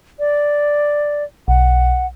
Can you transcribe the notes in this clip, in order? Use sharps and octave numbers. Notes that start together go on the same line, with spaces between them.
D5
B1 F#5